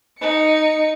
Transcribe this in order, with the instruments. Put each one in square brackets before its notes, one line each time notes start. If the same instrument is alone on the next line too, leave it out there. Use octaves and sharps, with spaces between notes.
[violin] D#4 C#7